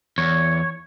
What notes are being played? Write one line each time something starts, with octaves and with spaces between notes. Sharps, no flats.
E2 C#5